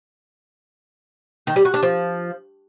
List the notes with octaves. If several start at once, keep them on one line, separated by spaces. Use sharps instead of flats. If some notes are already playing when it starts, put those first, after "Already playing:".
D#3
G3
F#4
D4
F3